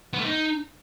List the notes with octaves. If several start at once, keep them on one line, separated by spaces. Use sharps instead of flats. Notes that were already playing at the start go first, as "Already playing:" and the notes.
B3
A3
D#4